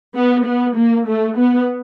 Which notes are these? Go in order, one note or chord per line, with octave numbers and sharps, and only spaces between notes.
B3
B3
A#3
A3
B3